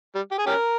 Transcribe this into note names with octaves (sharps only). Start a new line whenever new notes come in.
G3
G4
G#4
C#4 G4 A#4